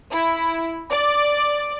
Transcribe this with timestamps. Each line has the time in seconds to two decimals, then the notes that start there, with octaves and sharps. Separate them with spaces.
0.10 E4
0.88 D5